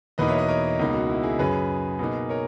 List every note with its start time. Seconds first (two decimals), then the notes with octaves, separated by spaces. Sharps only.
0.18 E2 B2 A#3 D#4 B4 D#5
0.28 C#5 E5
0.38 B4 D#5
0.48 A#4 C#5
0.79 C#2 B2 A#3 D#4
0.94 F#4
1.10 E4
1.23 E4 G#4
1.39 F#2 C#3 F#3 G#4 B4
1.99 B2 A#3 D#4
2.29 A#4 C#5